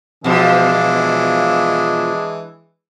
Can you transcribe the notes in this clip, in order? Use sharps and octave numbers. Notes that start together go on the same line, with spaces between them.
B2 E3 F3 G#3 D4